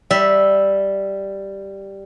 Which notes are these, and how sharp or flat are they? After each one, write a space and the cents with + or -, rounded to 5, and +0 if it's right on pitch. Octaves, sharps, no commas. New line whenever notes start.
G3 +0 E5 -5